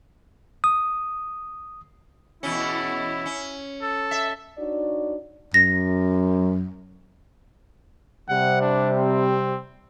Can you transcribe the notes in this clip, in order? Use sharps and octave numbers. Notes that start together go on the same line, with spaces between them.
D#6
E2 B2 C#4 E4
C#4
A4
E5
D4 D#4 F#4 C#5 D5
F#2 A#6
C3 G3 F#5
D4
C4